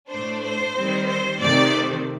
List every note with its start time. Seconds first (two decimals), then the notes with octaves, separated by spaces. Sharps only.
0.10 A2 A3 D4 C5
0.42 C5
0.75 D#3 G3 C4
1.09 C5
1.41 C3 D#3 A3 C4 D5